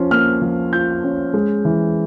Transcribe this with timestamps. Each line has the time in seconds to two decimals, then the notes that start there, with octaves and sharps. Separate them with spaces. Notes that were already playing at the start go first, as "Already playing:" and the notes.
Already playing: F3 C#4 F4
0.11 A#3 F6
0.41 F3
0.73 F4 G6
1.04 C#4
1.34 G#3
1.65 E3